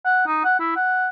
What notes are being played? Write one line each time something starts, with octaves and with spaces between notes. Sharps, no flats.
F#5
D#4
F#5
E4
F#5